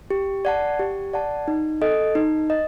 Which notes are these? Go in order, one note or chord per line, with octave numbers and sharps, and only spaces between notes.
G4
D5 F#5 A5
G4
D5 F#5 A5
D#4
A4 D#5
D#4
D#5